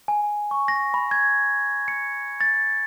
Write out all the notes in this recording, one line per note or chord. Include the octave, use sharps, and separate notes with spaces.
G#5
C#6
A#6
B5
G#6
C#7
A6